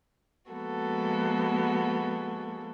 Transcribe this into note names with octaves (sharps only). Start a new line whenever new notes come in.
F3 G#3 A#3 B3 F#4 A4